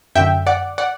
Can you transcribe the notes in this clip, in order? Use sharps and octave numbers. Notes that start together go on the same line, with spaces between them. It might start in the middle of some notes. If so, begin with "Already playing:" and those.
F#2 D3 E5 G5
D5 F#5
D5 F#5